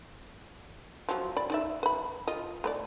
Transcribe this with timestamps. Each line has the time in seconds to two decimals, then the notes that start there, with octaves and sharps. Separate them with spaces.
1.09 F3 F#3
1.37 D5 B5
1.50 D#4 D5 E5
1.83 B4 B5
2.27 F4 D#5
2.64 A3 B4 D5